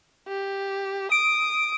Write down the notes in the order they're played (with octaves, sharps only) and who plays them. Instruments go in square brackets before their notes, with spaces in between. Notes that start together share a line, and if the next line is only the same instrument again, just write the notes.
[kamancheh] G4
[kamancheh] D#6 [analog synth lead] D7